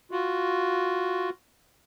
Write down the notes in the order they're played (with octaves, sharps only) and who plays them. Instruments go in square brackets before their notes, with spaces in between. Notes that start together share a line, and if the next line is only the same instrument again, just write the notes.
[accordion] F4 F#4